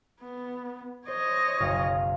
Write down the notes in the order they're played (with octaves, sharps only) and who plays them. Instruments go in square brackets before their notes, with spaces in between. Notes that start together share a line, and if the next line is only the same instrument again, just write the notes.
[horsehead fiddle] B3
[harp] C5 [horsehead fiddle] C#5 D#5
[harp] F#1 B1 F5